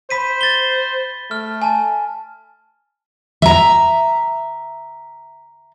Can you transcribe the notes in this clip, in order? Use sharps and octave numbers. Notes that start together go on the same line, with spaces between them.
C5 B5 B6 D#7
A6 G7
A3 F6
G#5 A5
E5 A#5